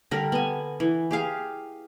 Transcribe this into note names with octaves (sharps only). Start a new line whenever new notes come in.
D3 G3 A#4
B3 G#5
E3
G4 G#4 F5